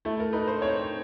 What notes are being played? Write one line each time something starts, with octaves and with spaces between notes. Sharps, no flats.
A3 E4
A#4
D#4 B4
C5
C4 C#5